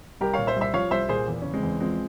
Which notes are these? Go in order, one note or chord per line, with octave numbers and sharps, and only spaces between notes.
C2 G4 A#4
A#2 C#5 F5
C5 E5
C2
C5 E5
F3 C#5 F5
C2 C5 E5
A#2 G#4 C5
E2
C#3 C#4
G#3 C4
E2
F3 G#3 C4